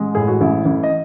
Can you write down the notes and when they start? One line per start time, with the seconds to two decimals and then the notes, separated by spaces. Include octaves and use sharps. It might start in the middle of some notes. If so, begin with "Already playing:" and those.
Already playing: A1 G#3
0.15 A2 G#4
0.27 F#4
0.41 A1 E4
0.65 A1
0.83 D#5